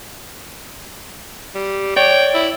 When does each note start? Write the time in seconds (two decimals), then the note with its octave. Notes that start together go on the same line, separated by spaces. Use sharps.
1.55 G3
1.96 C#5 D5 G5
2.34 E4